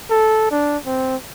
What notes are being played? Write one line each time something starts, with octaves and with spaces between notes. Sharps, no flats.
A4
D4
C4